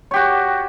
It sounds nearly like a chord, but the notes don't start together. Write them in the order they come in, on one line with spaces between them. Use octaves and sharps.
C#5 G4 F#4